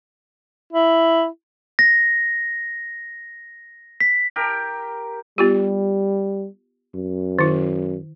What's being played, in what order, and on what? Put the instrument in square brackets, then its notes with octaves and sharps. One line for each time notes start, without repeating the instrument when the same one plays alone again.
[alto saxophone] E4
[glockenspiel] A#6
B6
[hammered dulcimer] G4 A#4
[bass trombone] G3 [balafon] B3 F4 G4
[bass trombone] F#2
[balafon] D#3 E4